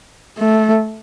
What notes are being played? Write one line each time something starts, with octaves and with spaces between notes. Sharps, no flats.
A3